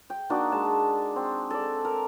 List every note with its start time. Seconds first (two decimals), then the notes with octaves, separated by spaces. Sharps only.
0.10 G5
0.30 A#3 D4 D#4 F#4
0.52 G#3 A5
1.16 C4
1.50 A4 D5
1.85 A#4